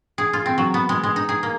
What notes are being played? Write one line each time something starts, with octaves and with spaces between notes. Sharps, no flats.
G#4
F4
C4
F#3
B3
G#3
G#3
D#4
G#4
A#3